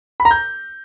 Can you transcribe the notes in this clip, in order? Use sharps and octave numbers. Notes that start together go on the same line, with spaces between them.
B5
A#5
G6